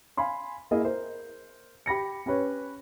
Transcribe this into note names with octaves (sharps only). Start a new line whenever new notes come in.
F5 G#5 B5 C6
A#3 E4 G#4 D#5
A#4 C5
G4 B5 A#6 C#7
C#4 G4 B4 C#5